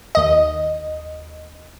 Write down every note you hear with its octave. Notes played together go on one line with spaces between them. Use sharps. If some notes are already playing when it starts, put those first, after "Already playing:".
D#2 D#5